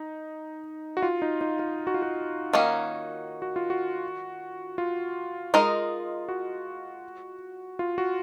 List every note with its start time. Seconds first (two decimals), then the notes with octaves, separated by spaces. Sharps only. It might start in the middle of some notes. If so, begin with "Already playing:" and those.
Already playing: D#4
0.97 F#4
1.02 F4
1.22 D#4
1.41 D#4
1.59 F4
1.87 F#4
1.94 F4
2.02 F#4
2.53 D#3 A#3 C#4
3.42 F#4
3.56 F4
3.70 F#4
4.78 F4
5.54 G#3 D#4 A#4
6.29 F#4
7.79 F4
7.98 F#4